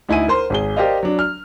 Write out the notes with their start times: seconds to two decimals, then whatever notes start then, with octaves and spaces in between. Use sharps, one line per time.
0.09 D2 D#4 E4 G#5 D#7
0.28 A#4 C5 C6
0.50 G#1 G#4 G7
0.76 G4 A#4 C5 D5 D#5 F5
1.03 F#3 D4
1.19 F6